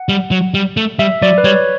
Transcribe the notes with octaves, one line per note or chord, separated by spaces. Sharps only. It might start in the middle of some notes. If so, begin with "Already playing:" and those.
Already playing: F#5
G3
F#3
G3
A3
G3 E5
F#3 D5
B4
G3 C#5